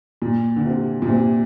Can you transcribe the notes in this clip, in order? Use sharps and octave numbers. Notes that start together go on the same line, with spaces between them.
A#2
D3
C3
A#2
C3